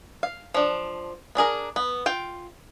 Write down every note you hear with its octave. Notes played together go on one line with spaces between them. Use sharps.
F5
F3 D4
B3 D4 G#4 A#4
B3
F4 G5